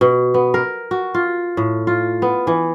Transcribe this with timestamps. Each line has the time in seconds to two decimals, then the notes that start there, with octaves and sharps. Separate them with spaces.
0.01 B2
0.34 B3
0.54 A#4
0.91 F#4
1.14 F4
1.57 A2
1.87 F4
2.22 B3
2.47 E3